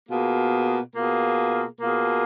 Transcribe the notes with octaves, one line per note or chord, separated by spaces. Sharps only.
B2 A#3 F4 G#4
B2 A#3 F4 G#4
B2 A#3 F4 G#4